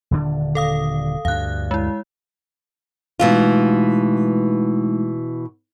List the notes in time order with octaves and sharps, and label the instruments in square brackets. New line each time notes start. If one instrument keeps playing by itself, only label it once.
[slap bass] D#1 D3 D4
[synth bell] A4 F5 D#6
[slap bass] D2 G2 [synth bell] F5 F#6
[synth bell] G#3 E4
[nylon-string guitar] B2 E3 F4 [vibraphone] G#3 A3 D#4